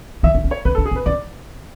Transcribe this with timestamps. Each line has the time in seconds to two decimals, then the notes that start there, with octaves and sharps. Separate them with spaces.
0.23 E3 E5
0.35 D4
0.44 C#4
0.51 C#5
0.65 C#4 B4
0.75 A4
0.78 D4
0.85 G#4
0.91 C#4
0.96 B4
1.06 C#4 D5